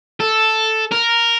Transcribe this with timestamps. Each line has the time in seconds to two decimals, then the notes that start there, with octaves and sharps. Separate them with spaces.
0.20 A4
0.92 A#4